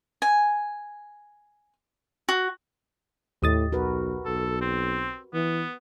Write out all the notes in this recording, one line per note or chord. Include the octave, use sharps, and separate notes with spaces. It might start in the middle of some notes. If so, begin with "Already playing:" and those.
G#5
F#4
D#2 A2 G4 D#5 D#6 A6
B1 F#4 A#4 B4
B1 A4
C4
E3 B3